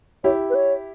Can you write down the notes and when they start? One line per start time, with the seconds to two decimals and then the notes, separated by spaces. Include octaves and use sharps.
0.24 E4 G4 C#5
0.50 B4
0.55 C#5